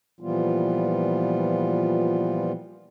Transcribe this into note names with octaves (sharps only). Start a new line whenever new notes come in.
A#2 E3 F3 G3 B3 F4